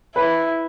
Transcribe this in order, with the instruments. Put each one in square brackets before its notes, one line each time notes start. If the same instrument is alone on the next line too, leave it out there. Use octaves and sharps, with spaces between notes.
[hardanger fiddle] E4 [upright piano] B4